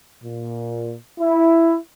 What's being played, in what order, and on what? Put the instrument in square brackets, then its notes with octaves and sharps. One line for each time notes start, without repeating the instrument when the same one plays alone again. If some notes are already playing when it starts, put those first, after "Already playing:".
[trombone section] A#2
E4